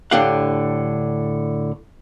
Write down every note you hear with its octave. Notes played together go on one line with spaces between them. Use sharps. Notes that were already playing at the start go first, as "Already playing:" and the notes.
A2 D3 D4 G4 F5 F#5